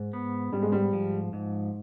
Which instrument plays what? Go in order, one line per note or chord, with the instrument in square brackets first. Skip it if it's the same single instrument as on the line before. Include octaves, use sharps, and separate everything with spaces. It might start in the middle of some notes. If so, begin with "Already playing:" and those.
Already playing: [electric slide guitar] G#2
B3
[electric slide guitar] G#2 [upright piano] G3
[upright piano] G#3
G3
[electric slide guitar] F3
G#2